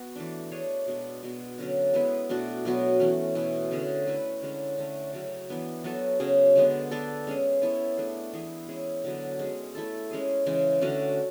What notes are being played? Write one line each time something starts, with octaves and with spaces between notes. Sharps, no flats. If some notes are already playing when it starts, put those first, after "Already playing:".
Already playing: B3 F#4
E3 A3 D4
A3 D4 G#4 C#5
B2 G#3 D4
B2 G#3 B3 F#4
D3 F#3 C#4
G#3 B3 E4 B4
B2 A3 D4 F#4
B2 F#3 B3 F#4
E3 A3 C#4
B2 A3 E4
D3 A3 C#4 G#4
A3 E4 B4
D3 G#3 C#4
D3 A3 C#4
C#3 F#3 C#4
E3 B3 D4
F#3 B3 F#4 A4
C#3 F#3 C#4 G#4
D3 G#3 B3
B3 D4 A4
G#3 C#4 G#4
B3 E4 A4 C#5
A3 D4 G#4
E3 B3 E4 G#4
G#3 C#4 E4 G#4
D3 F#3 B3
G#3 C#4 G#4
A3 E4 A4
G#3 C#4 G#4
C#3 E3 G#3
D3 A3 C#4 F#4